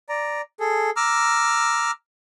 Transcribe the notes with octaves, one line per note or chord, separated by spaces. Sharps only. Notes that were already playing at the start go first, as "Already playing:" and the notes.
D5 A#5
G#4 A4
A#5 D6 E6 F6